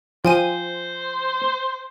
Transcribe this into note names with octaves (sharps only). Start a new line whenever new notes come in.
F3 C5 G5 G#5 D#7